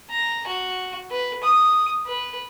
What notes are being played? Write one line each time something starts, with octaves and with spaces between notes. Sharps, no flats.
A#5
F#4
B4
D#6
B4